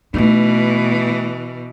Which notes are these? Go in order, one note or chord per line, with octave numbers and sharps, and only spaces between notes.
B2 E3 A3 D#4